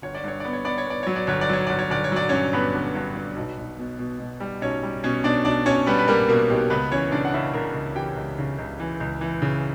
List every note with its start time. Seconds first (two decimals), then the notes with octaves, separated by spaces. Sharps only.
0.02 G1 C#5
0.15 D5
0.24 G2 C#5
0.40 B3 D5
0.53 C#5
0.65 B3 D5
0.78 C#5
0.87 B3 D5
1.03 F#3 C#5
1.16 D5
1.27 G1 C#5
1.41 D5
1.49 F#3 C#5
1.67 G1 D5
1.79 C#5
1.90 G1 D5
2.04 C#5
2.12 F#3 D5
2.29 G2 C#4 C#5
2.53 G2 B3 B4
2.74 G1
2.95 G2
3.15 G2
3.36 B1
3.58 B1
3.79 B2
3.99 B2
4.20 B2
4.40 G3
4.61 B1 C#4 C#5
4.83 G3
5.04 B2 C#4 C#5
5.24 B2 D4 D5
5.45 B1 D4 D5
5.66 B1 C#4 C#5
5.87 G3 B3 B4
5.99 B4
6.08 G3 A#3 A#4
6.29 B2 A#3 A#4
6.50 B1 G4
6.70 C#2 B3 B4
6.92 E3 C#4 C#5
7.12 C#3 D4 D5
7.25 F#5
7.34 C#3 E4 E5
7.53 C#3 A#4 A#5
7.74 C#2
7.95 E3 G4 G5
8.16 C#2
8.38 C#3
8.58 C#2
8.80 E3
9.00 C#2
9.21 E3
9.42 C#3